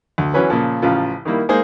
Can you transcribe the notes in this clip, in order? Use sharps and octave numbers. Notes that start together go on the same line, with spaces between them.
D2
E3 F#3 C#4 B4
A#2 C#3 F3
A1 C#3 F3 F4
D#3 G3 A#3 E4
G#3 A#3 D#4 G#4 C5